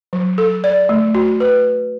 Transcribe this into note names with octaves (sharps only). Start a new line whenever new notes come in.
F#3
A4
D5
A3
F#4
B4